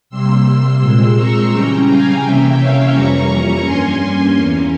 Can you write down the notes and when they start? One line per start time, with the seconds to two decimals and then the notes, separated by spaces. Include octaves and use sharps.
0.09 C3 G3 A#3 C6 E6
0.45 C6 E6
0.80 A#2 G#3 C4
1.16 A#5 C#6
1.51 C#3 E3 G3 C#4 G5 A#5
1.87 F5 G#5
2.21 C3 E3 A#3 C#4 E5 G5
2.57 C#5 F5
2.92 F2 E3 G3 A#3 C#4 A#5 C#6
3.62 G2 G3 A#3 C#4 G#5 C6
4.33 E2 E3 A#3 C#4